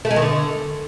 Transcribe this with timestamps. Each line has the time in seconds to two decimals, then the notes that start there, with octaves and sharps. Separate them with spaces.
0.05 A3
0.11 G#3
0.16 D#3
0.22 D3